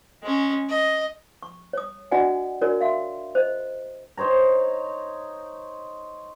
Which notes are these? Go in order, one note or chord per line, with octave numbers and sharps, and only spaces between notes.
G#3 C#4
D#5
C#6
C#5 D#6
D4 F#4 D5 D#5 F#5 G#5
D4 F#4 A#4 C#5 D5
E5 F5 C6
C5 D#5
D#4 C5 C#5 A#5